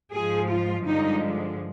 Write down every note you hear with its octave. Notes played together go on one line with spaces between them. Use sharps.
G#2 F3 G#3 G#4
F4
G2 D3 F3 G#3 D#4